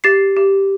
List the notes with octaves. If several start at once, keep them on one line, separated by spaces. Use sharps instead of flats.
G4 A6 C7
G4